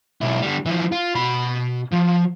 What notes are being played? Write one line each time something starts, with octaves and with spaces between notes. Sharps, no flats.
B1 E4
D3 G3
E3 F3
F4
B2 B5
F3